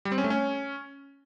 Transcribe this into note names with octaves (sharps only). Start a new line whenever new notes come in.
G3
C4
C#4
A3
C#4